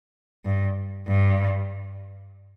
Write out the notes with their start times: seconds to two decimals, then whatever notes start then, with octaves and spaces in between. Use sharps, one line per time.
0.45 G2
1.08 G2